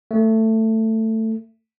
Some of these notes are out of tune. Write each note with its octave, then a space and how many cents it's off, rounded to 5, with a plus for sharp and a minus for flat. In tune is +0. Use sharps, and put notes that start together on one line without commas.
A3 +15